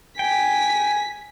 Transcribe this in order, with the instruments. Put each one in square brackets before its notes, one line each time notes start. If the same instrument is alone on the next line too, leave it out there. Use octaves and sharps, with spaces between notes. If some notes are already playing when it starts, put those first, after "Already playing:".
[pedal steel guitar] G5 [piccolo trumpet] G#5 [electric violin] B6